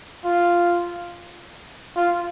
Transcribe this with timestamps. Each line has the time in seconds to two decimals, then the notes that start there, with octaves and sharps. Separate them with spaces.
0.25 F4
1.97 F4